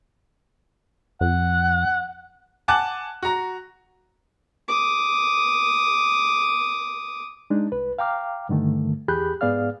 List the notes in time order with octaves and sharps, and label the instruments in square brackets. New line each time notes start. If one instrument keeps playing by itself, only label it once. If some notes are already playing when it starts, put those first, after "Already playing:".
[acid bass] F2 [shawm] F#5
[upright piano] F#5 G#5 A5 D6 F#6
F#4 A#5
[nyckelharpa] D6 D#6
[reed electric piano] G#3 D4 D#4
C2 B4
F5 G5 A#5 D6 F6
G2 D3 D#3 A3
E2 G4 G#4 B5 F#6 G6
G#2 B3 G#4 D5 F5 F6